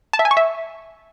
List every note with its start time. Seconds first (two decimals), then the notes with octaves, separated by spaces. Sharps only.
0.13 A5
0.19 E5
0.25 G#5
0.31 C#6
0.37 E5